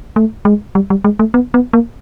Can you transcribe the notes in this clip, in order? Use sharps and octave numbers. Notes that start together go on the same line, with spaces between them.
A3
G#3
G3
G3
G#3
A3
B3
B3
A#3